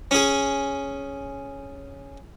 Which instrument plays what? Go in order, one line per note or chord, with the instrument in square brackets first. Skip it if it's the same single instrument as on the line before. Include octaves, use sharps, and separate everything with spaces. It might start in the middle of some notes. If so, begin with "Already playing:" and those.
[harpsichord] C#4 G#4